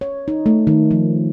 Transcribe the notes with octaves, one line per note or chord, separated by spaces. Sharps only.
C#5
D#4
A3
D#3
F3